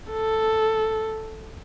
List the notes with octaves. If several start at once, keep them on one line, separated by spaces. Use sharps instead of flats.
A4